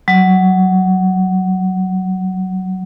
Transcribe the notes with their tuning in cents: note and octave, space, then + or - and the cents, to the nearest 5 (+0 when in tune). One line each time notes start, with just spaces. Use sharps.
F#3 +15